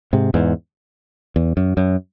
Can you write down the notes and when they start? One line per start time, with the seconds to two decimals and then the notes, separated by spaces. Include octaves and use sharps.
0.13 G#2 C3
0.34 E2 G#2
1.36 E2
1.57 F#2
1.77 F#2